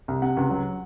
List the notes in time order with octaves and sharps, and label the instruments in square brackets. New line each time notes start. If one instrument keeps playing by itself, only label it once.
[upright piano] C2
C3 F#5
C#2
F#3